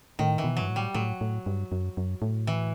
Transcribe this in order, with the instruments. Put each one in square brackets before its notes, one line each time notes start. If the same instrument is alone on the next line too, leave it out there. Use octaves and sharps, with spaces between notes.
[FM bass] A2 [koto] D#3
[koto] E3
[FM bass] B2
[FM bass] G2 [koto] F#3
[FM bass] A2
[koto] G3
[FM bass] A2 [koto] F#3
[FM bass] A2
G2
F#2
F#2
A2
[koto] E3